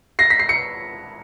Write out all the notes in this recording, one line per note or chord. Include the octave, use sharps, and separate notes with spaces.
A#6 C7
B6
C7
C#7